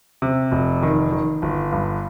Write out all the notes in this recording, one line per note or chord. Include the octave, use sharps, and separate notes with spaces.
C3
F1
D#3
D#3
G1
G2